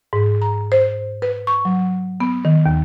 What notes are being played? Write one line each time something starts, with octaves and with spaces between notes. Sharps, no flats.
G#2
A#5
C5
B4
C#6
F#3
B3
D#3
D#2